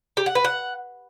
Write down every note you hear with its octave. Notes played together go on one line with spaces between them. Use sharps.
G4
F#5
B4
F#5